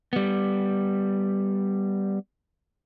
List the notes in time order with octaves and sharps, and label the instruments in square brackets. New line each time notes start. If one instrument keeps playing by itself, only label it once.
[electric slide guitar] G3 B3